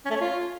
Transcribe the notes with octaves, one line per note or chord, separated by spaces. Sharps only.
C#4
A3
C#5
F4